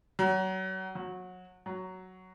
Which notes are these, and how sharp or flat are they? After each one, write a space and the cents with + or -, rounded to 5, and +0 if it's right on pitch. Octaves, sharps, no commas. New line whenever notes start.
F#3 +30
F#3 -20
F#3 +5